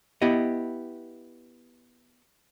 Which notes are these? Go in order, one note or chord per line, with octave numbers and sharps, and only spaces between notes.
B3 E4 G4 D#5